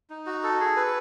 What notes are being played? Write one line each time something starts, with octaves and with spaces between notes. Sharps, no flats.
D#4
F#4
A4
G#4
B4